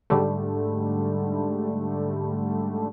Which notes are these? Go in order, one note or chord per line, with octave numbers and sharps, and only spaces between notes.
G#2 D3 G3 A3